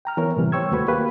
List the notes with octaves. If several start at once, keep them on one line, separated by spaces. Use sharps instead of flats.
G5 A#5 F6
E3 B3 A#4 C#5
A2 C3 E3 G3
C5 C#5 G5 C#6 E6 G#6
D#2 A3 F#4 B4 B5 C#6
A#3 G4 B4 F5